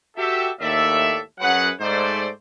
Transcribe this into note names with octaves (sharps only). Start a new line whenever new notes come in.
F#4 G4 A4 E5
D#2 A2 A4 D5 E5
F#2 F#3 G#4 B4 F#5
G#2 A3 C5 D5